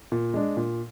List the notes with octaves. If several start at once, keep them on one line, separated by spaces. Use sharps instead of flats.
A#2
G#3 D4
A#2